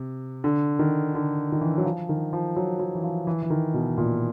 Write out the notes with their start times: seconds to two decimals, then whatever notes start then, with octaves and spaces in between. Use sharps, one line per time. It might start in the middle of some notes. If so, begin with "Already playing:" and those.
Already playing: C3
0.44 D3
0.79 D#3
1.15 D3
1.52 D#3
1.61 E3
1.78 F#3
1.85 F3
2.09 D#3
2.33 F3
2.56 F#3
2.80 F#3
2.95 E3
3.04 F3
3.27 E3
3.42 E3
3.50 D#3
3.74 B2
3.98 A#2